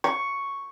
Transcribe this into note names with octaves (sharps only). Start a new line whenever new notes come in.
C#6